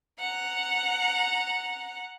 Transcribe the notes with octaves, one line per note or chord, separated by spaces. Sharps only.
F#5 A#5